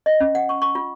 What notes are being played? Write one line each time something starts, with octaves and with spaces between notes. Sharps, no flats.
D#5
C#4
F#5
C#6
C#6
F4